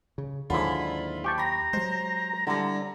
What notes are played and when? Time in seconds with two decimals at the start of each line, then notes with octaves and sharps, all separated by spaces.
0.18 C#3
0.50 D#2 G#2 D3 F#3 E4 F4 B5
1.24 G4 G5 A5 C#6
1.38 A#5 B5 A#6
1.73 F#3 G#3 C5
2.47 D3 G3 E4